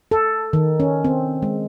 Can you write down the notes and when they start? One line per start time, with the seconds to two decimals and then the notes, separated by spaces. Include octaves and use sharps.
0.11 A4
0.53 D#3
0.80 C#4
1.04 C4
1.43 G#3